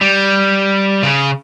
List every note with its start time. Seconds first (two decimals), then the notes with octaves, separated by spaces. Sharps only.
0.01 G3
1.03 C#3